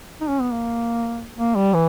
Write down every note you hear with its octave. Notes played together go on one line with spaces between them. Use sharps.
D#4
C#4
B3
A#3
A#3
G3
E3